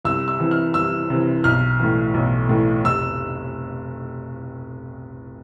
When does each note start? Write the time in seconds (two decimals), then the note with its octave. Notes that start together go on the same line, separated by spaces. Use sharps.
0.05 C2 E6
0.28 E6
0.40 C3 E3
0.51 F6
0.74 C2 E6
1.10 C3 E3
1.44 B1 F6
1.79 A2 E3
2.14 B1
2.49 A2 E3
2.84 F1 E6